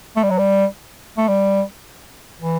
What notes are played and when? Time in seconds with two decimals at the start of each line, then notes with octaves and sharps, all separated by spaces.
0.17 A3
0.23 G3
0.30 F#3
0.38 G3
1.17 A3
1.28 G3
2.40 E3